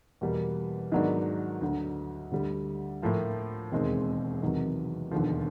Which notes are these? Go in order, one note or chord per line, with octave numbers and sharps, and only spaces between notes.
E2 B2 G3 A#3
G#2 D#3 F#3 B3 D4
D2 D3 F#3
D2 D3 G3
A2 F3 A#3
E1 D#2 D#3 G#3 C4
E2 C3 D#3 F#3
E1 D#2 D3 F3